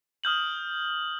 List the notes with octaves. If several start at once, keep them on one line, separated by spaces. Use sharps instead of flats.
D#6 F6 G6 F#7